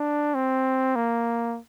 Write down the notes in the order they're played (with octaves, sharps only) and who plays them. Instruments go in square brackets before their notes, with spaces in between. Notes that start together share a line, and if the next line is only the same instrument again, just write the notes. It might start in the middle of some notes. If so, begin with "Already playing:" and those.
Already playing: [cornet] D4
C4
A#3